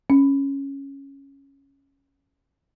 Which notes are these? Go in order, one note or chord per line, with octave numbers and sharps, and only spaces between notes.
C#4